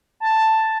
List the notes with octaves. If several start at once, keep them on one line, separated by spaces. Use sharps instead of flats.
A5